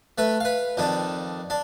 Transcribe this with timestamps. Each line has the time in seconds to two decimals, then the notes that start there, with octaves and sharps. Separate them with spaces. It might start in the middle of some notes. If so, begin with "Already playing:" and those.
0.18 A3 B4
0.40 B4 F5
0.77 F2 D#3 D4
1.50 D4